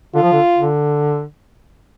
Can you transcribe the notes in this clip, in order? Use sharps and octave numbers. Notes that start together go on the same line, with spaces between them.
D3 F4
F3
D3
D3